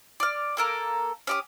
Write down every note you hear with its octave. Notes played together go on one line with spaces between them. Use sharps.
D5 F6
A#3 A4 A#4
C#4 G4 D#6